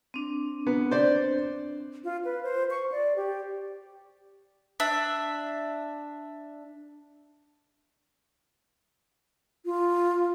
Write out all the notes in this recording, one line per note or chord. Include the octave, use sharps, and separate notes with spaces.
C4 D4
B3
C5 D5
F4
B4
C5
C#6
D5
G4
D4 E5
F4